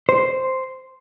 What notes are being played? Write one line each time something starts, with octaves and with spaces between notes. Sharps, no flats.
C5